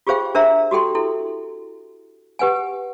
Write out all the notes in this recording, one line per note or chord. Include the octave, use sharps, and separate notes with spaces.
F4 G4 G#4 C5 F5 G5
D4 A#4 C5 E5 A#5
F#4 G4 A4 G5 C6
E4 A4
G4 B4 F#5 G#5